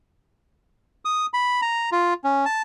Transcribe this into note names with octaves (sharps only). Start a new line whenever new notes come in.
D#6
B5
A#5
F4
C#4
A5